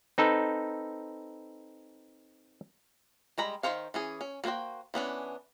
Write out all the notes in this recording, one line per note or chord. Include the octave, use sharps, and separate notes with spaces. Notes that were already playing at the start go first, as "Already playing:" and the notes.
C4 D#4 A4 B4
G3 G#3 A#5 B5
D#3 C#4 C5 C#5 F5
E3 C#4 G#4
C#4
G3 A#3 F#4 C5 G5
E3 B3 C#4 D4